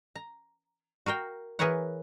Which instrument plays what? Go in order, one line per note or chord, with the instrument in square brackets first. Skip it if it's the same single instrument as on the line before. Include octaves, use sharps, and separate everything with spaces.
[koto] A#5
F#4 A#4 F5 G5
E3 G#4 A#4 B4 C#5 F#5